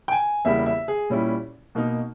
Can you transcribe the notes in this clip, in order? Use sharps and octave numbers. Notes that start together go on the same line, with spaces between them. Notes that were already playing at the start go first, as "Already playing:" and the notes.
G5
G#5
E2 C#3 G3 A#3 E4 E5
E5
G#4
A#2 G3 C#4 E4
B2 A#3 D#4